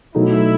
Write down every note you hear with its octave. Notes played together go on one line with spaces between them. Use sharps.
B2 F#3 A3 D#4 E4